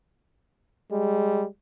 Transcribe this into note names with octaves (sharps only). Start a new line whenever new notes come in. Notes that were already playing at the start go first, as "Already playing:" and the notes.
G3 G#3